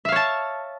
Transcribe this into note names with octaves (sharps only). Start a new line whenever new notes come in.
C#5 E5 F5 A5